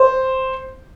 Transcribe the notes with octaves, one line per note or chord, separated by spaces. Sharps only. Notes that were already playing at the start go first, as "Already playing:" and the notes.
Already playing: C5